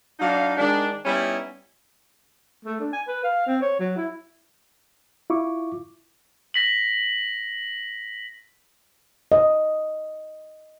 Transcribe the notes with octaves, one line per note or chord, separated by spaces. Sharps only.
F#3 D4 D#4 F5
D#3 G#3 D4
G3 B3 C#4 D#4 E4
A3
D4
G#5
B4
F5
C4
C#5
F#3
E4
E4 F4 C#6 D6
A#6 B6 F#7
D#5